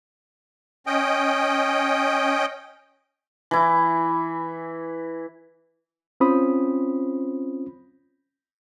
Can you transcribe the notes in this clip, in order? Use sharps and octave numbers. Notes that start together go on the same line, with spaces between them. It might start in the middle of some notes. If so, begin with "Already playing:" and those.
C#4 D#5 G5
E3 E4
C4 C#4 F4 C5 B5 D#6